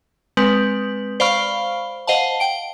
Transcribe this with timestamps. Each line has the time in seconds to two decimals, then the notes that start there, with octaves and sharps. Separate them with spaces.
0.37 G#3 C4 B4
1.20 C5 D5 F5 B5 C#6 F6
2.07 C5 D#5 F5 F#5 A5
2.40 G5 D7